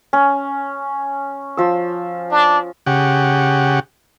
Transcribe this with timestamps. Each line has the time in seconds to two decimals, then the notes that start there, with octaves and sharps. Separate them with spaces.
0.13 C#4
1.57 F3 E6
2.30 D4
2.86 C#3 G4 F#5